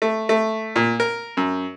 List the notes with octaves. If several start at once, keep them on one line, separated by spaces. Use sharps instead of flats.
A3
A3
A#2
A#4
F#2